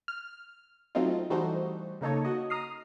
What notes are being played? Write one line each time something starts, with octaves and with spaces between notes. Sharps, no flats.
F6
F#3 A3 C4 D#4 F4
E3 G3 A3 D#4 F#4 C5
C#3 A#3 D#4 A4 C#5
F#4 D#5
A#5 D#6 F6 C7